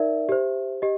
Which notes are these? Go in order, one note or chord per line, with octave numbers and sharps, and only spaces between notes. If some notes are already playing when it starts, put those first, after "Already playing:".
Already playing: D#4 A#4 D5 E5
G4 C5
G4 D#5